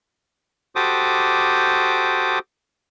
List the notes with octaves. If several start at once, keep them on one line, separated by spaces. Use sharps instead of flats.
F#4 G4 A4 C5 D6 D#6